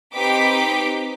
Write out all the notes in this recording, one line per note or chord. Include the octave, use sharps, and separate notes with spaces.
C4 D#4 G4 B4 D6 B6